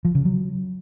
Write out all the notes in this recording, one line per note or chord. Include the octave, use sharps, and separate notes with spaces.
F3
C#3
F#3